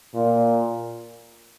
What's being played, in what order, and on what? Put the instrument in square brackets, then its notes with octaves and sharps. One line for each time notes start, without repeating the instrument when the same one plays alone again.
[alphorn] A#2